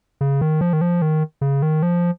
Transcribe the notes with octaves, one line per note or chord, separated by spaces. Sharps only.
C#3
D#3
F3
D#3
F3
D#3
C#3
D#3
F3